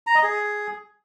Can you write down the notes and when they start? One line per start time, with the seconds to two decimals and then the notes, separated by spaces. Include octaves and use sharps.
0.07 A#5
0.15 D#5
0.23 G#4